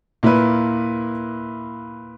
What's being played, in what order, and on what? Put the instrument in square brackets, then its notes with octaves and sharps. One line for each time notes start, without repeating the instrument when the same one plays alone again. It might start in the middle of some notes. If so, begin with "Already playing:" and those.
[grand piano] A#2 A#3 E4 B4